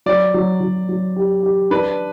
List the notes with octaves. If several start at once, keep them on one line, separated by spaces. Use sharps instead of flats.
F#3 D5
F#3
F#3
F#3
G4
G4
D4 B4